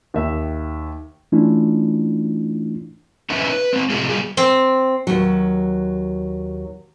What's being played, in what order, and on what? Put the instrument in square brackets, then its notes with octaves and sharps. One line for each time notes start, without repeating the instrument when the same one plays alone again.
[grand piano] D#2 D#3 E5
[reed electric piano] E3 A3 C#4 D4 E4 F4
[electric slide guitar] C#4 D#4 E4 B4 E5
B4
G#3 C4
A2 C3 C4 F4 F#4 G#4
G3 F#4 G#4
[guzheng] C4
[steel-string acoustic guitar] D#2 F#3